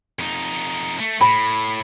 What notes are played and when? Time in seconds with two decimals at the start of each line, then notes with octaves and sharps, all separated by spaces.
0.19 F2 D#4
1.00 A3
1.21 A2 B5